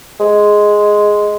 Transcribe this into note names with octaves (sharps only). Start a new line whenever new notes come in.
G#3